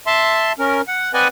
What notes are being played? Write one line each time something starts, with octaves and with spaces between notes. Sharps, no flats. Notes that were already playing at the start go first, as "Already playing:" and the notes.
E5 A5 C6
C#4 A#4
F#5
C4 B4 D5 D#5 F#5 G#5